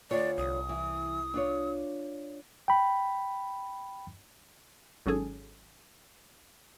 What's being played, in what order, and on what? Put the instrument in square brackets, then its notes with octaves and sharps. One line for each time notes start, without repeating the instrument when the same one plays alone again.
[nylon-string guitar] D2 F4 C#5 [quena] D5
[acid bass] C2 [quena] D#6
[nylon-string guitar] E3
D4 F4 C#5
[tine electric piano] G5 B5
[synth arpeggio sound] G#1 F#3 C#4 G#4 A4